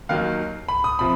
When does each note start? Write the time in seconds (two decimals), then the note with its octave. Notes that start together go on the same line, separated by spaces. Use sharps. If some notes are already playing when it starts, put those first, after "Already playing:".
0.09 D#2 D#3 F#3 F5
0.69 B5
0.84 D#6
0.99 C3 F3 B5